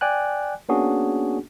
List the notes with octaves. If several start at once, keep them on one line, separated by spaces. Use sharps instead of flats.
D5 G5 G#5 F#6
A#3 B3 C#4 D4 F#4 G#4